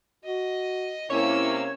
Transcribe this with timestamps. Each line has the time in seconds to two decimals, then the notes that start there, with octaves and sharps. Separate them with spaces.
0.25 F#4 D#5
1.10 C3 A#3 C#4 E4 C#5 E6